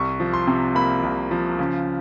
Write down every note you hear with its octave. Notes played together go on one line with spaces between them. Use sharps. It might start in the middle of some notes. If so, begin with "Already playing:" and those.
Already playing: C2 C#6
F3
C6
C3
A#3 B5
C2
F3
C#3